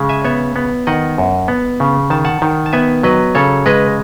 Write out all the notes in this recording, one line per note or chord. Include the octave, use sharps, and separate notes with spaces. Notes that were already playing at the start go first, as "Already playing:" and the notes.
Already playing: C#3 G#3
E5 G#5
B3 C#5 E5
B3
D#3 D#5 F#5
F#2
B3
C#3
D#3 A5
F#5 A5
D#3
A5
B3 E5 G#5
F#3 B4 D#5
C#3 A4 C#5
G#3 B4 D#5